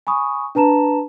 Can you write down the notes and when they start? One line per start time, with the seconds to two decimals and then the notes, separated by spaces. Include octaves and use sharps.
0.07 G#5 B5 C#6 D#6
0.55 D4 B4 A5 A#5 E7